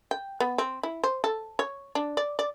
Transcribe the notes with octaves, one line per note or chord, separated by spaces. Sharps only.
G5
B3
C4
E4
C5
A4
C#5
D4
D5
D5